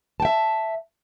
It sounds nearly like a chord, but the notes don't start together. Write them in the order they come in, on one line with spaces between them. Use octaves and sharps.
A5 G5 E5